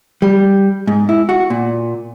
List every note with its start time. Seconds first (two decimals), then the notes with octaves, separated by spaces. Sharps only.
0.22 G3
0.87 G#2
1.09 E4
1.29 F#4
1.50 A#2